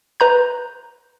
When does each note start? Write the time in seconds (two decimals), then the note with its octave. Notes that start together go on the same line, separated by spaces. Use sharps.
0.20 B4 A#5 G6